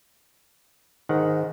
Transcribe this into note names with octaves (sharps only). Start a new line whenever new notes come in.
G#2 D#3 F#5